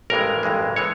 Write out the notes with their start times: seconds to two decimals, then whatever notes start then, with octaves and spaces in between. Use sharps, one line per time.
0.10 A1 G2 E3 G#3 A#4
0.43 A1 G2 E3 G#3
0.76 E3 G#3 C#5